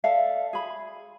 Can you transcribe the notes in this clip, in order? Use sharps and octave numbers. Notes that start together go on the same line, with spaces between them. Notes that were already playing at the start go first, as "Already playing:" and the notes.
A4 D5 E5 F5
G#4 B5